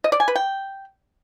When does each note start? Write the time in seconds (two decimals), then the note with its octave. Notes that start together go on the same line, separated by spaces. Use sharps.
0.04 D#5
0.12 D5
0.20 G#5
0.28 B4
0.36 G5